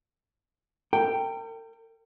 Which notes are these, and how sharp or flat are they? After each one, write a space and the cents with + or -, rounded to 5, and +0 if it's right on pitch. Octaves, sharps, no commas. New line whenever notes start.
A#4 -45 G5 +0